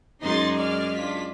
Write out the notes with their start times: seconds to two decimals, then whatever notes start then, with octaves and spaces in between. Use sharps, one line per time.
0.22 F#2 G#3 D#4 C6 A6
0.57 D5 F6
0.96 D4 F4 B6